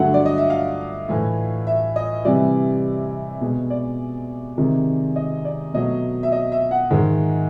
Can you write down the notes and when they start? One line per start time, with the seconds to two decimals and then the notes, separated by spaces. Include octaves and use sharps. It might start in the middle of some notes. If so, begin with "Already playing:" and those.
Already playing: G2 D3 F#3 A3 F#5
0.14 D5
0.26 D#5
0.38 E5
0.50 F5
1.09 A2 E3 A3
1.67 E5
1.96 D#5
2.25 C3 E3 G3 D5
3.41 B2 G#3
3.70 D5
4.58 C3 D#3 G#3
5.16 D#5
5.45 D5
5.74 B2 F#3 A3 D#5
6.23 E5
6.32 D#5
6.52 E5
6.71 F#5
6.90 G#2 D#3 G#3